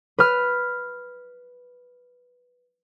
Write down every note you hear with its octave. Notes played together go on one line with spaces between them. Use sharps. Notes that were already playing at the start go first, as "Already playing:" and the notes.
B4 F6